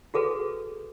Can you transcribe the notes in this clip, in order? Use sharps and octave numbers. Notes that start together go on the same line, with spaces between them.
F#4 G#4 A4 B4